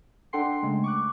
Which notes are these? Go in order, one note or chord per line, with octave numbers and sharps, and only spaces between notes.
D4 A4 F#5 G5 C6 C7
C#3 G#3 A3
C#6 D6 F#6